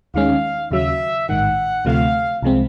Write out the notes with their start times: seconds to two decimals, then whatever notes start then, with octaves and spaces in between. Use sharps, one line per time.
0.14 D#2 D#3 G#3 C#4 F5
0.71 D#2 C#3 F#3 E5
1.29 A1 G#2 D#3 F#5
1.85 D2 C3 F3 A3 F5
2.43 C2 C3 F3 G#3 C4